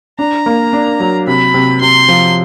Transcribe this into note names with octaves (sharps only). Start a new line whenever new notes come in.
D4 A#5
A#3
D4
F#3
C3 B5
C3
C3 C6
F3